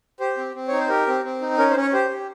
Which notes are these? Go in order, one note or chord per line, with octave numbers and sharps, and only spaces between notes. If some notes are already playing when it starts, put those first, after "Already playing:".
G4 C5
C4
C4
D#4 C#5
C5
G4 A#4
C4
C4
D#4
C#4 A#4
C5
C#4
C#5
G4 C5
G4